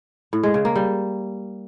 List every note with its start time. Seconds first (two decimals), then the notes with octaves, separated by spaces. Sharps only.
0.33 A2
0.43 G#3
0.54 C#3
0.65 A#3
0.76 G3